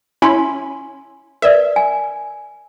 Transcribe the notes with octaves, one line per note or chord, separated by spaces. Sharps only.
C#4 E4 G#5 B5 C6
A#4 B4 D5 E5
G#5